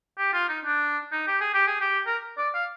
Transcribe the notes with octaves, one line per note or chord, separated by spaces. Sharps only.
G4
F4
D#4
D4
D#4
G4
G#4
G4
G#4
G4
A#4
D5
F5